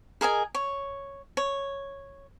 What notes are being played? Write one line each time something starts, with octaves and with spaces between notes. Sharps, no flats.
G#4 A#4 D#5 G#5
C#5
C#5